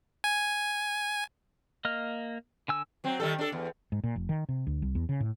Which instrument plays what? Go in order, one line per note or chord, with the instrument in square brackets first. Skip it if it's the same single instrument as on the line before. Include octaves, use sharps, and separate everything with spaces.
[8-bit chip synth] G#5
[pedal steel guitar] A#3 D#5 F6
D3 G#5 E6
[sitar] F#3 C4
D#3 G3 A4
D4 A4
E2
[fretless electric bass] G#2
A#2
F1
D#3
C3
D2
C2
E2
C#3
A2